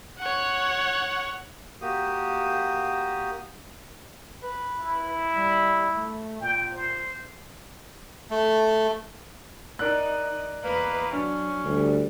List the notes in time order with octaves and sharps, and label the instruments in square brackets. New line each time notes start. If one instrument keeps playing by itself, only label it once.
[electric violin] C#5 F#5
[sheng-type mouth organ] A#3 F#4 G4 D#6
[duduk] B4
[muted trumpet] E4
[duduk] G3
A3
[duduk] A#2 [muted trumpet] G5
[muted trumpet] C5
[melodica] A3
[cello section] D#4 [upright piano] A#4 D5 F#6
[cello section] E2 B4 D#5 [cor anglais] A#3
[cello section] F#3 [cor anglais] C#4 [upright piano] D4
[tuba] D2 [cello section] G3